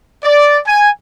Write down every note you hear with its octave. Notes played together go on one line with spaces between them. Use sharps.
D5
G#5